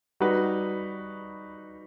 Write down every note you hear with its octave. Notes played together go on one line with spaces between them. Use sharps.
G3 D#4 F#4 B4